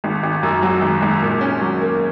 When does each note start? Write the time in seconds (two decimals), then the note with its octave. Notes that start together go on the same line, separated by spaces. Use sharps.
0.04 G#1
0.23 G#1
0.43 F#2
0.63 F#3
0.82 G#1
1.02 G#1
1.22 A#2
1.41 C#4
1.61 F#3
1.81 A#3